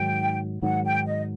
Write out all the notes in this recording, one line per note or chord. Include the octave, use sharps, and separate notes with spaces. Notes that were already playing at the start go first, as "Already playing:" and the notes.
Already playing: G#2 D#3 F#3 G5
G#2 D#3 F#3 F#5
G5
D#5